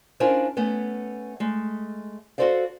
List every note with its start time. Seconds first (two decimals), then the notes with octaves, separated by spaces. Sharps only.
0.20 C#4 D4 E4 F4 A#4 C5
0.57 A3 B3 C#4
1.40 G#3 A3
2.38 F#4 G4 A4 C5 D5 F5